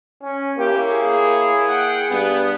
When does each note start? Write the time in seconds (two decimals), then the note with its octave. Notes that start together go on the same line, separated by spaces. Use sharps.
0.22 C#4
0.58 A#3 E4 G4 C#5
0.90 G#4
1.69 F#5 G5
2.10 G2 B3